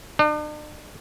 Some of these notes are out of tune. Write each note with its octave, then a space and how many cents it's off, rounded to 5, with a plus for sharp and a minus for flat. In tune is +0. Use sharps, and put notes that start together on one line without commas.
D4 +45